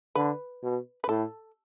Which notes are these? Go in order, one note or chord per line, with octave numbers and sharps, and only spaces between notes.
D3 B4
B2
B4
A2 A4